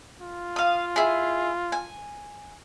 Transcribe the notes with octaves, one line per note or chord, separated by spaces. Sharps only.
F4
F5 D#6
E4 G#4
G#5